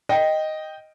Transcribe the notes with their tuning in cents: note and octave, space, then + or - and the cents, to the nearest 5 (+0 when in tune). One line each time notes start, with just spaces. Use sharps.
D#5 +0 G5 +0